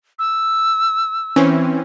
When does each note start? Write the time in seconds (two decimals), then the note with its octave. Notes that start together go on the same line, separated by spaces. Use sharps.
0.19 E6
1.36 E3 C4 C#4